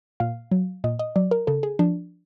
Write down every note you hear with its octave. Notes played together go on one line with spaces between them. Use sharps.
A#2 F5
F#3
A#2 D#5
D#5
F#3 D5
A#4
C#3 A4
G#4
F3 D4